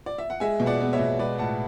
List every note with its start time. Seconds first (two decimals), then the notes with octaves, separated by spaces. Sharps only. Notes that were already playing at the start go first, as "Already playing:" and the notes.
0.06 D5
0.18 E5
0.30 F#5
0.40 G#3 E5 G#5
0.60 B2
0.66 D5 F#5
0.80 B3
0.93 C#5 E5
0.99 B2
1.19 G#3 B4 D5
1.38 A2 F#5 A5